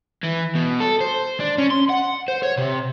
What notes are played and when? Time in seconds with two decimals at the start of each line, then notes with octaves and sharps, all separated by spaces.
0.23 E3
0.55 B2
0.80 A4
1.01 C5
1.40 D4
1.58 C#4
1.70 C6
1.89 F#5
2.28 C5
2.43 C#5
2.58 C3